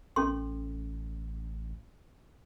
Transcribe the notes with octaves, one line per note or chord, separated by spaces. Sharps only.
A1 C#4 A4 C6